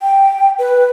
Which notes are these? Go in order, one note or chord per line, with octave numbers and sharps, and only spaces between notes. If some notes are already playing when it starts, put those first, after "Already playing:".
G5
B4